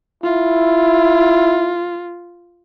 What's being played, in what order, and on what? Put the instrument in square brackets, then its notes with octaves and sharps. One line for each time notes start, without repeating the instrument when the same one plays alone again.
[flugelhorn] E4 [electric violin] F4